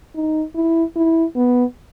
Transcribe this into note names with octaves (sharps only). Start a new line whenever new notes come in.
D#4
E4
E4
B3